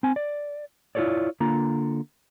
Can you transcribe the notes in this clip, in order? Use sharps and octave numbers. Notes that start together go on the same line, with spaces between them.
C4 G#5
D5
E4 F4 G#4 A4 C#5 D5
D3 A#3 F4 A#5